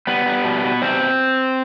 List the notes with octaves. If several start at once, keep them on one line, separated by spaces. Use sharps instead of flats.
G3 B3
G3
B2
B2
G3 C4